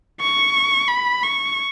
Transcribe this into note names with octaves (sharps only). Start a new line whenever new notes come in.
C#6
B5
C#6